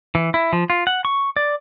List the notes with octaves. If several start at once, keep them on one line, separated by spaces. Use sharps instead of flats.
E3
E4
F3
F4
F#5
C#6
D5